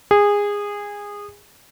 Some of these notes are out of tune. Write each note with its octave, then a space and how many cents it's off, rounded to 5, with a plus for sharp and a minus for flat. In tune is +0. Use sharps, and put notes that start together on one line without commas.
G#4 -20